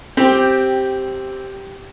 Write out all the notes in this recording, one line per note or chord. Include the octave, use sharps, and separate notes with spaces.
C4 G4